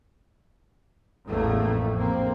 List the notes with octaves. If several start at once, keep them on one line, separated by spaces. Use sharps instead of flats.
A1 E2 A2 A3 A#3
F2
A#1 A#3 C4